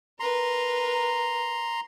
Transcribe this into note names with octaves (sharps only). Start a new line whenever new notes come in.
A#4 B4 A#5 C6